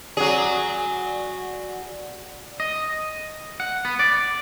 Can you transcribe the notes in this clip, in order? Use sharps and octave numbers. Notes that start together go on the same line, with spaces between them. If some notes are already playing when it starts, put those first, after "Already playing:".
F#3 G#4 D5 F#5
D#5
F#5
B3
D5